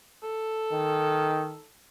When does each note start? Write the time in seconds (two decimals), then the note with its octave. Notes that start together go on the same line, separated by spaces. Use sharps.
0.23 A4
0.72 D#3